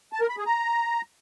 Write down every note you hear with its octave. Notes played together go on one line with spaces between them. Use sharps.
A5
A#4
B5
G#4
A#5